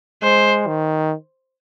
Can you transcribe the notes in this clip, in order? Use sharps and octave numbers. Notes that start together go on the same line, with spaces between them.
G#3 C5
D#3